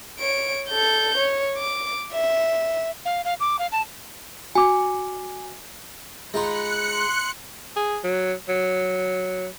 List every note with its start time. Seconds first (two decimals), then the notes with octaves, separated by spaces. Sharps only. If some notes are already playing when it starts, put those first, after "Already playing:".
0.19 C#5 D7
0.70 A4 G6
1.17 C#5
1.57 D6
2.13 E5
3.05 F5
3.24 F5
3.40 D6
3.58 F5
3.71 A5
4.55 F#4 G#5 D6
6.34 G#3 D#4 F4 B5 F#6 C#7
6.94 C6
7.76 G#4
8.04 F#3
8.49 F#3